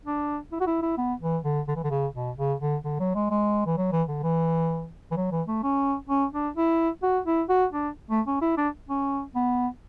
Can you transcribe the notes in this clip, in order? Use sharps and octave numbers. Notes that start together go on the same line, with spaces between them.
D4
E4
F#4
E4
E4
B3
E3
D3
D3
E3
D3
C#3
B2
C#3
D3
D3
F#3
G#3
G#3
E3
F#3
E3
D3
E3
E3
F#3
E3
A3
C#4
C#4
D4
E4
F#4
E4
F#4
D4
A3
C#4
E4
D4
C#4
B3